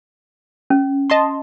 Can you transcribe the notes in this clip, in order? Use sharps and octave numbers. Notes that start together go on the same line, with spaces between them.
C#4
D#5 A5 C6